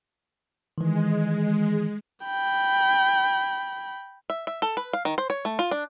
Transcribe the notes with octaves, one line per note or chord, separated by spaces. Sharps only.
D#3 E3 G#3
G5 B5
E5
E5
A4
B4
F5
D#3
C5
C#5
A3
F4
D4